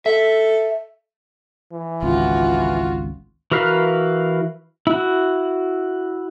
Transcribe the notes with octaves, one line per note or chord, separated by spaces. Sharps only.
A4 E5
E3
G#1 C#2 F4 F#4
E3 F#4 A#4 B4 F5
E4 F#4